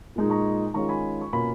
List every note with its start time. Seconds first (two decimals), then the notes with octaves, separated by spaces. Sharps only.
0.16 A#2 G#3 D#4
0.30 A#5 C#6
0.74 D#3 G#3 C#4 F4 A#5 C#6
0.89 G#5 B5
1.21 C#6
1.33 B2 A#3 C#4 F4 G#5 B5